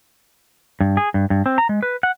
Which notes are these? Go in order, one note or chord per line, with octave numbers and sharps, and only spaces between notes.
G2
G#4
G2
G2
C4
A#5
G#3
B4
F#5